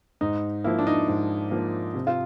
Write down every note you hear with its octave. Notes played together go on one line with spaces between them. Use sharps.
G#2 D#4
F3 A#3 E4
D4
D#4
G#2
F3 A#3
C3
F4